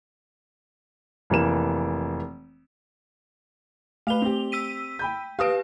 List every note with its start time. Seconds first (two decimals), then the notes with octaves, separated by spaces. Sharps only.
1.30 F1 E3 A#3 E7
4.07 A3 B4 F5 F7 G7
4.22 C4 G4
4.52 E6 B6 D#7
4.99 G5 B5 G6
5.39 G4 B4 F5 D#6 D7